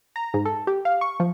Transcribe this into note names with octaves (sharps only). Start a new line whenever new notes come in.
A#5
G#2
A4
G4
F5
C#6
F3